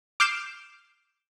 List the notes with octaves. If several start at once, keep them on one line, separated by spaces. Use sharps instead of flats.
D6 F6 G6 C7 D7 E7